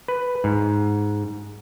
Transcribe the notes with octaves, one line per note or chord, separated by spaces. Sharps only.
B4
G#2